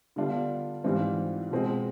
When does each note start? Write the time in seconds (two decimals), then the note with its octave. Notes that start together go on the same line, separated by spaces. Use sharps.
0.16 D3 G3 B3 D4 F4
0.84 G#2 E3 G3 C4 F4
1.51 B2 G#3 C4